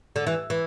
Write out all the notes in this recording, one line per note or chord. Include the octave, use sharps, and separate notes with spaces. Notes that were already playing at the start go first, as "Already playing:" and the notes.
D3
E3
E3